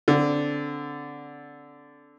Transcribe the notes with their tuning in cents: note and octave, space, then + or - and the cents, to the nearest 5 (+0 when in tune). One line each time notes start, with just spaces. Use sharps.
D3 -10 C4 -10